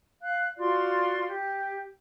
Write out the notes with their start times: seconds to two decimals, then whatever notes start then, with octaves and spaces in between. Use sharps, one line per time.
0.21 F5 F#6
0.57 F4 F#4 D5 C6
1.28 G4